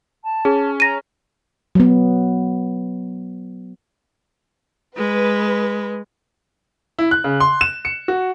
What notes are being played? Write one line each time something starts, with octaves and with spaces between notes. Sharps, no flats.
A5
C#4 G#4
A#5 A#6 D#7
F#3 B3
G#3 B4
E4
F#6
C#3
C6
E7
C#7
F#4